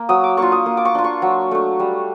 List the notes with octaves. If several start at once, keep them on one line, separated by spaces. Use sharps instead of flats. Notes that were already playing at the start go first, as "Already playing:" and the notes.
Already playing: A#3
F#3 D#6
D6
A#3 D4 F4 C#6
D#6
A#3
D6
C#6
D4 F4
C#6
F#3
A3 D4
G3